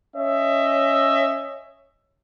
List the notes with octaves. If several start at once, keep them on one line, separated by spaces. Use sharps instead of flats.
C#4 C#5 D#5 E5